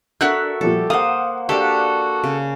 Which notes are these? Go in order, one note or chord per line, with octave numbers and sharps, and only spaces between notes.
D4 F#4 A4 A#4 E5 F#6
A#2 F3 G3 G4 A4
A#3 C5 F5 F#5 D#6
A#3 D4 F#4 G4 A4
C#3